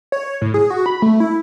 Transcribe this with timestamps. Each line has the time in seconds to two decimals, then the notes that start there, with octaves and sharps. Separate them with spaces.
0.12 C#5
0.42 A2
0.54 G#4
0.70 F#4
0.86 B5
1.02 A3
1.20 E4